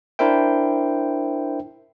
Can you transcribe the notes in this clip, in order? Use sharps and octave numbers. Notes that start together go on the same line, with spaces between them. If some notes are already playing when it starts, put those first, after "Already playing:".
D4 E4 A#4 C5 E5 G5